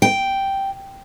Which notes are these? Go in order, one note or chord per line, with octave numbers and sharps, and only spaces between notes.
G5